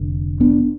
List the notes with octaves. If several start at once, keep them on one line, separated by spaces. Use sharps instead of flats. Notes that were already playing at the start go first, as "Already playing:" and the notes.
Already playing: F1 D3
B3 D4